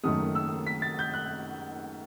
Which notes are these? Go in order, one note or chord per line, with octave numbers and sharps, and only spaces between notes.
F#1 F#2 D#3 F#3 A3 D#6
E6
B6
A6
G6
F#6